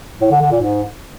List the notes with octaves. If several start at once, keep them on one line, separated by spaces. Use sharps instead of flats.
A2
D3
D3
A#2
G#2